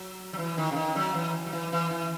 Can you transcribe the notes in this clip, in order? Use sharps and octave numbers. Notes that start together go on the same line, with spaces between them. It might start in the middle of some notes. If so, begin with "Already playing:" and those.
Already playing: F#3
F#3
E3
D#3
C#3
D#3
F#3
E3
F#3
E3
E3
E3